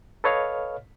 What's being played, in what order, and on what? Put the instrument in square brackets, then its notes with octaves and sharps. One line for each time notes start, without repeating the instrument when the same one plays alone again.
[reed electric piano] A4 B4 C#5 D#5 F5 F6